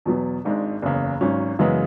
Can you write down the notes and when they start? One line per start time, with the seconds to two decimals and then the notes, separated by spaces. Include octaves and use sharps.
0.06 E2 B2 F#3 B3
0.45 G#1 G#2 G#3 D4
0.82 F#1 E2 C#3
1.21 G#1 G#2 F#3 C#4
1.59 F#2 C#3 E3 G#3 B3